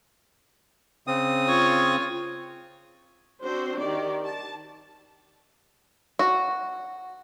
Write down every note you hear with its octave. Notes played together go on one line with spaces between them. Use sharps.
C#3 C4 D#6
F4 C#5
C4 D4 F#4 C5
D#3 G4 D5
A5
F#4